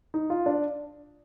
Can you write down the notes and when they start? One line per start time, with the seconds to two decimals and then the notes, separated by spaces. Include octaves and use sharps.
0.14 D#4
0.30 F4
0.46 D4